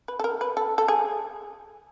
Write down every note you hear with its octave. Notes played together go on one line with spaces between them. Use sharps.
B4
A4
A#4
B4
A4
A4
G#4